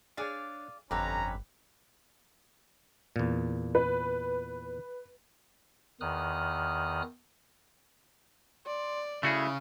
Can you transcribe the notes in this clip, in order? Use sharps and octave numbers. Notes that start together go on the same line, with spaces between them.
D4 G#4 C#5 D5 F5
G1 F2 D3 C#4 G4 B4 A#5
E2 A#2
B4
E2 D#3 D#6 F6 F#6
D5 C6
C#3 A3 E4 F#4 G#4